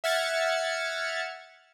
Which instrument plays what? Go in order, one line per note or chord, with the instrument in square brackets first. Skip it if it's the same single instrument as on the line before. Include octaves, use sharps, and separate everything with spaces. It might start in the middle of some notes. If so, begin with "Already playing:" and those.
[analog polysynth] E5 F#5 F6 G#6 A6 C#7